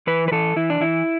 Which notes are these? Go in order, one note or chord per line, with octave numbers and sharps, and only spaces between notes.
E3 B4
B4
E3 A4
E3 E4
D4
E3 E4